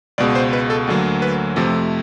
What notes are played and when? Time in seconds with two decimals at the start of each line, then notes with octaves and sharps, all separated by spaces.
0.18 C#2 B2 G#3 D5
0.35 C5
0.53 B4
0.70 A4
0.87 D2 D3 F#3 A#3
1.22 B4
1.56 F2 C3 F3 A3 A4